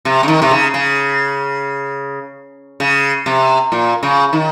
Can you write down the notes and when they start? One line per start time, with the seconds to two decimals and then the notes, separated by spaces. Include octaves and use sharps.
0.05 C3
0.23 C#3
0.28 D#3
0.42 C3
0.51 C#3
0.74 C#3
2.80 C#3
3.26 C3
3.72 A#2
4.03 C#3
4.33 D#3